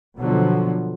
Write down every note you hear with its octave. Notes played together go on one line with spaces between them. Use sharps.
B2 D3 F3 F#3